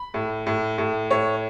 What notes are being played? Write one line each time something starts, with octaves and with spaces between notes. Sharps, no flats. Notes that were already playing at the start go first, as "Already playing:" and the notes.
Already playing: B5
A2
A2
A2
A2 C#5